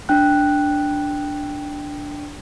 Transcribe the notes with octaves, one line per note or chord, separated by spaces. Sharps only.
D4 G5 F#6